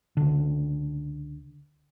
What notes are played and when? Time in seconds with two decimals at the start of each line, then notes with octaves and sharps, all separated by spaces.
0.17 C#2 D3